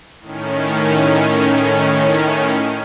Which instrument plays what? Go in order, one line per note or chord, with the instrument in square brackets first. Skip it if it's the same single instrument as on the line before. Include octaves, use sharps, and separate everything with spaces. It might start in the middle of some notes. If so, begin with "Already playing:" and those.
[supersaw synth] A2 D#3 C#4